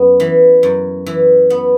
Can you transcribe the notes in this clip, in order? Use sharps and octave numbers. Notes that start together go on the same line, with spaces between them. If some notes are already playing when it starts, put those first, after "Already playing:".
Already playing: F#2 B3
E3
F#2
E3
B3